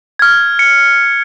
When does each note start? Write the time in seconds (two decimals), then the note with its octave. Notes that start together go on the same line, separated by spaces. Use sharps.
0.19 F6 G#6
0.59 C#7